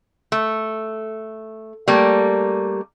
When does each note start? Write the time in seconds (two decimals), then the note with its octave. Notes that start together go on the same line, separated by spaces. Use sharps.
0.32 A3
1.88 G3 A3 A#3